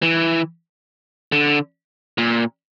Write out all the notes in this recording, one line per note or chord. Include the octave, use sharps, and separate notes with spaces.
E3
D3
A#2